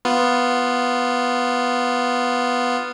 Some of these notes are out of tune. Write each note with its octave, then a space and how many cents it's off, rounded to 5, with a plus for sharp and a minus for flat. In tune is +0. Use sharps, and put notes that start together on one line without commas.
B3 +0 F4 +0